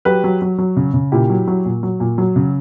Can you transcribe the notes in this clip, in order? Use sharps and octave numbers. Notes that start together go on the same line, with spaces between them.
F#3 G4 B4
F#3
F#3
F#3
C#3
C#3
A#2 E4 G4
F#3
F#3
A#2
F#3
A#2
F#3
C#3